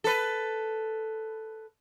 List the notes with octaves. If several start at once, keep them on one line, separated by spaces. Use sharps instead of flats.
A4 B4